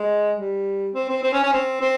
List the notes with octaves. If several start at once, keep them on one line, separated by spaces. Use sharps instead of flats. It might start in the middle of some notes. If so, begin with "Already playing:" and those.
Already playing: G#3
G3
C4
C4
C4
C#4
C#4
C4
C4